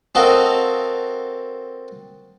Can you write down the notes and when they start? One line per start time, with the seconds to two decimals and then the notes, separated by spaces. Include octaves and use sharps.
0.15 C4 F#4 A4 A#4 D#5 F5